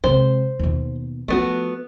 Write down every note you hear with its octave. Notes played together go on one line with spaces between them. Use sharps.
C3 G#3 C5
D#2 B2
F3 A3 B3 F#4